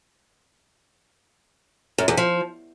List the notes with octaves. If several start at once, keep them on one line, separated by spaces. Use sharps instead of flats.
F#2
E2
F3